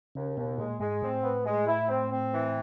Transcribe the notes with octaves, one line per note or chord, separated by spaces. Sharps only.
D#2 C#3
D#2 B2
A#2 G#3
G#2 G#3
A2 C4
B3
G#3
E4
C4
C4
E3